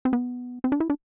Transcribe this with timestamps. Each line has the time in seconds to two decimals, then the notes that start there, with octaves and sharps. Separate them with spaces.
0.05 C4
0.13 B3
0.64 C4
0.72 D4
0.80 E4
0.90 D4